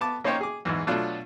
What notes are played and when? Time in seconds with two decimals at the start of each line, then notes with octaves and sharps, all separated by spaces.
0.01 B3 A5 D6
0.24 A#3 C#4 D#4 C5 C#5 G5
0.41 G#4 D6
0.65 E2 G#2 E3
0.87 B2 F#3 A3 D4 F4 F#6